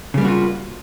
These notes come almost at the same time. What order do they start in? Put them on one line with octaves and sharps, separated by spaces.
C#3 G3 A#3 F#4 F4